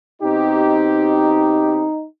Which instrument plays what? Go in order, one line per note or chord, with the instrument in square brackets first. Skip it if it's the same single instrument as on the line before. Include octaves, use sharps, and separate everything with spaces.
[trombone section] B2 C4 G4 [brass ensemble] D#4